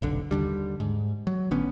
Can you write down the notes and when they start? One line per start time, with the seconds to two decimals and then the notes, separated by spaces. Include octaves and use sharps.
0.02 F1 B1 D3
0.31 D#2 D3 G3
0.80 G#2
1.27 F#3
1.51 A1 D3 B3 C#4